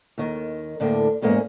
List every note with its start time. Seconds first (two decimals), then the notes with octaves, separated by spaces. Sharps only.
0.18 D#2 D#3
0.80 D2 A2 D3 A#3 D4
1.22 E2 G#2 G#3 A#3 C#4